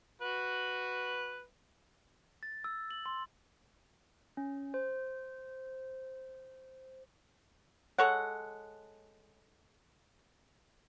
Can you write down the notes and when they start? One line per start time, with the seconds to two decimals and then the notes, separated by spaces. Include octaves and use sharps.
0.21 F#4 B4
2.43 A6
2.64 E6
2.91 F#7
3.06 C6
4.37 C#4
4.74 C5
7.98 G#3 A4 C#5 F#5